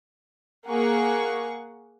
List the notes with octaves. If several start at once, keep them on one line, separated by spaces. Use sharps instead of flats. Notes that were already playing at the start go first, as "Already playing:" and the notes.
A#3 G#4 F#5 C#6